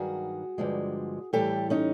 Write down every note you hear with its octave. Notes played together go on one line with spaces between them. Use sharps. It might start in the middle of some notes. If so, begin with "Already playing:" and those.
Already playing: G2 D#3 F#3 F#4 G#4
G2 D3 F3 G#3
A2 E3 G3 G4 A4
C#4 D#4